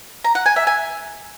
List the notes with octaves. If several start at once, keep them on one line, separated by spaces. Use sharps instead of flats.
A#5
F#5
G#5
E5
G#5